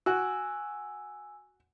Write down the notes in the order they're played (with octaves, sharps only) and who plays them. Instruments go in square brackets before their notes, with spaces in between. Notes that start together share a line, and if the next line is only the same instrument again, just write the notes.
[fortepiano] F#4 [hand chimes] G#5 E6